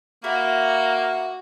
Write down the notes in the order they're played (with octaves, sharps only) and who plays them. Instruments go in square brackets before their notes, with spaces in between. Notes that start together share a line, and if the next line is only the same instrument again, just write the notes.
[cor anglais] A#3 [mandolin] E4 A#4 [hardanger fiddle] F#4